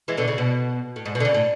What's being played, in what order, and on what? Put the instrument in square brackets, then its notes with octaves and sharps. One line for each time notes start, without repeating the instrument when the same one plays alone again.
[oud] E3 G#3
B2 D3
C#3
B2
A2
G#2
B2
D3
C#3
A2